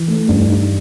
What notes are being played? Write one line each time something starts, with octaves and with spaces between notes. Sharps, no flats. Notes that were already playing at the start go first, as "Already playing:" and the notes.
Already playing: E3
A3
G2
D#4